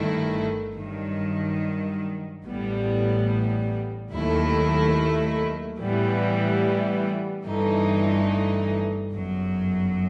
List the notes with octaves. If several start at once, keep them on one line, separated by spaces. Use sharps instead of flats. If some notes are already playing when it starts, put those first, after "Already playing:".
Already playing: G1 G2 D#3 A3 E4
G2 D#3 F#3
A1 A2 G3 B3
D#2 D#3 F#3 A3 E4
A2 E3 G3 B3
G1 G2 E3 A3 D#4
G1 F#2 F#3